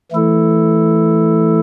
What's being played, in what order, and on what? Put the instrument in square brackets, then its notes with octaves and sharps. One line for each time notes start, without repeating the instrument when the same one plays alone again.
[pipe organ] E3 A3 E4 A4